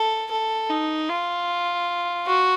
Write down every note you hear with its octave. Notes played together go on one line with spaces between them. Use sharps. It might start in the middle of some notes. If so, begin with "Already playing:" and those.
Already playing: A4
A4
D#4
F4
F#4